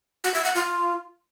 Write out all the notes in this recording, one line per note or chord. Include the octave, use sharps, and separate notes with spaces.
F#4
E5
F#5
F4